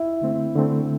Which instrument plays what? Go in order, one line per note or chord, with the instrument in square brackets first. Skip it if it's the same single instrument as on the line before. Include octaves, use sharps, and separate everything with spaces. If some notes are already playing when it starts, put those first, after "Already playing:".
Already playing: [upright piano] E4
[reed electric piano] D3 A3 C4
D3 A3 C4